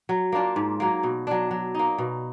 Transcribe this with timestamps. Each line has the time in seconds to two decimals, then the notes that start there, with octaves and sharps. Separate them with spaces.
0.09 F#3
0.32 A#3 D4 F4
0.56 G#2
0.80 F#3 A#3
1.03 B2
1.27 F#3 D4
1.51 F#3
1.75 A#3 D#4
1.98 B2